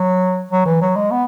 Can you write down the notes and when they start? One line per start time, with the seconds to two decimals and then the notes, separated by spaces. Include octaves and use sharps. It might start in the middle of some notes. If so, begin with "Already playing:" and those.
Already playing: F#3
0.51 F#3
0.65 E3
0.81 F#3
0.96 G#3
1.11 B3